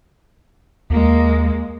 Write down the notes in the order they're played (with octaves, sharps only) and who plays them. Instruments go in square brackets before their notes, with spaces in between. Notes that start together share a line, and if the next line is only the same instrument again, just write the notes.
[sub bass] D#2 [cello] G#3 A#3